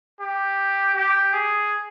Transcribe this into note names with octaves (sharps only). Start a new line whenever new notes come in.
G4
G4
G#4